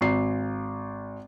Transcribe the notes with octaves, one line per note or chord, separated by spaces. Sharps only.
G#1 C7